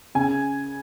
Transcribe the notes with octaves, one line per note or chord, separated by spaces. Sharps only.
C#3 G#5